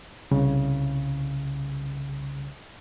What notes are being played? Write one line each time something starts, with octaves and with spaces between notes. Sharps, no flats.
C2 C#3